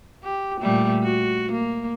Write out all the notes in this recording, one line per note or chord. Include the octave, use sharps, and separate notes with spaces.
G4
A#2 G3 A3
F#4
A#3